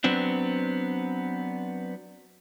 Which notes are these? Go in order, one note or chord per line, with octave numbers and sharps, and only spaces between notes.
F#3 B3 C4 D4